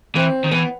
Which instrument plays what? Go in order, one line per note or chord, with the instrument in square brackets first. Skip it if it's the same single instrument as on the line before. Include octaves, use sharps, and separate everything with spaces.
[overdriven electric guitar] E3 [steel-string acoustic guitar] C4
[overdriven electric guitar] D#3
[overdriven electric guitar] E3 [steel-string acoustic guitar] B3